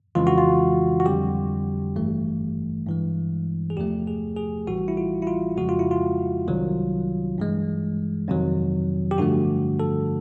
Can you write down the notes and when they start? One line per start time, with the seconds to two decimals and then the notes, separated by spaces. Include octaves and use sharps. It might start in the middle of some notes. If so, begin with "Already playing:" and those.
0.15 F2 C#3 E3 G#3 F4
0.27 F#4
0.38 F4
1.00 F#4
1.05 F2 D3 G3 G4
1.96 G#1 G2 E3 A3
2.87 G2 E3 G#3
3.70 G#4
3.77 E2 C3 F3 A3 G4
4.07 G#4
4.37 G#4
4.67 A1 A2 E3 G3 F#4
4.88 E4
4.97 F4
5.22 E4
5.27 F4
5.57 F2 C#3 F3 G#3 F#4
5.69 F4
5.79 E4
5.91 F4
6.47 C2 C3 D#3 F#3
7.38 G2 E3 G#3
8.28 F2 C3 D#3 F#3
9.11 G4
9.18 G2 D3 F3 A3 F#4
9.80 A4